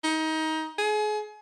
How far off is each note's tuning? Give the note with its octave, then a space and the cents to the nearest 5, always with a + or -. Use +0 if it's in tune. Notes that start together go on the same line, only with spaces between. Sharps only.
D#4 +25
G#4 +35